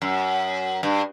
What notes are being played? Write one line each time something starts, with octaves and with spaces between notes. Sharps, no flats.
F#2
G2